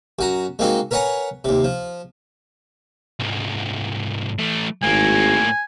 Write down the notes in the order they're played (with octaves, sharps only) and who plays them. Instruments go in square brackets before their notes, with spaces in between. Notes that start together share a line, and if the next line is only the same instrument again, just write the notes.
[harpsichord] F#2 F#4 A#5
G#3 A#3 C4 D#4 F#4
A#4 B4 C#5 F#5 G#5 A#5
D#2 C3
F3
[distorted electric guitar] C2 G#2
E3 A3
[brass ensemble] G#1 [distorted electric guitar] A2 A#3 [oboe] G#5